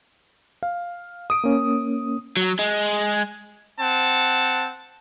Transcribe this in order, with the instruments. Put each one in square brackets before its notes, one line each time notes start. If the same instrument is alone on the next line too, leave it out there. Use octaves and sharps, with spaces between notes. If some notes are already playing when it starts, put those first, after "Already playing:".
[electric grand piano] F5
D#6 D7
[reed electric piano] A#3 C#4
[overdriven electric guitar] F#3
G#3
[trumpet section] C4 F#5 A5